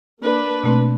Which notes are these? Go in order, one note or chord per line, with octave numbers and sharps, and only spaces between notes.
A#3 D4 B4
B2 A3 C4